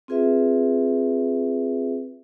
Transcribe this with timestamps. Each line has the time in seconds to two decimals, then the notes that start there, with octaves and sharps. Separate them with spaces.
0.08 C4 F4 G#4 B4 E5